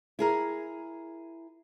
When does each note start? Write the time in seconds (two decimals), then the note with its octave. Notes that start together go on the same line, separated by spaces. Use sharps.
0.19 E4 G#4 A#4